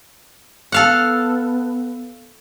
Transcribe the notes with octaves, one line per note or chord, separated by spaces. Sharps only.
B3 A4 F5 F#5